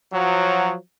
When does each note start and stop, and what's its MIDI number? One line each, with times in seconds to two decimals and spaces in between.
0.12 0.74 53
0.12 0.74 54